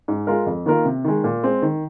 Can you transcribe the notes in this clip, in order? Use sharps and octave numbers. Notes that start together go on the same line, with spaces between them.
G#2
G#3 F4 A#4
F2
D#3 A#3 F4 A#4
C3
D#3 G#3
A#2
G#3 C4
D#3